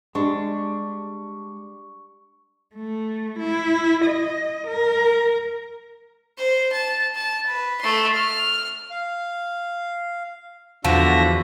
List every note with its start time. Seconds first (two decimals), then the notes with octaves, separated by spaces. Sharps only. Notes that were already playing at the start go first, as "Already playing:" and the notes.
0.15 G3 G#3 D4 C#6
2.76 A3
3.39 E4
4.05 D#5
4.68 A#4
6.37 C5
6.72 A5
7.15 A5
7.46 B4
7.81 A3 C6
8.14 F6
8.91 F5
10.85 E2 D3 F3 F#4 E5 A#6